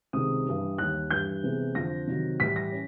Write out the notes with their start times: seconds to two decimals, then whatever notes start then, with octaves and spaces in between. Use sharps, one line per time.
0.13 C#2 C3 D#3 G#3 D#6
0.46 G2 E3 G3
0.78 D#2 D#3 G3 F#6
1.11 G2 E3 G3 G6
1.43 C3 E3 G#3 B3
1.75 F2 D3 F3 A#6
2.07 C3 D#3 F#3
2.40 A2 E3 G3 B6
2.56 A#6
2.72 C#4